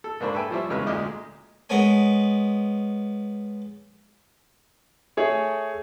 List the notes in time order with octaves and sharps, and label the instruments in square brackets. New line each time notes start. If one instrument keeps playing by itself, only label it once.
[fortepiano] A4
G#2 A#3 D4 C5 B5 C#6
A4 B4 E5 G5 G#5
F3 G3 C5 C#5 E5
E2 G2 C#3 G#3 B4 F6
D2 A#2 G#3 D#5 D6 F6
[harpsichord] G#3 B3 A#4 C#5 G#5
[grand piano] A3 G#4 C#5